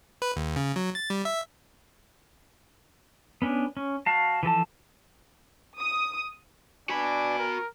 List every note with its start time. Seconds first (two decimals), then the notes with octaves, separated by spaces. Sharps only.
0.22 B4
0.36 D#2
0.56 C#3
0.76 F#3
0.95 A6
1.10 G3
1.25 E5
3.42 B3 C#4 D4
3.77 C#4
4.06 F#4 F5 A5
4.43 E3 F3 A4 A5
5.80 D#6
6.89 D4 F#4 B4 D5 G#5 B5
7.38 A#4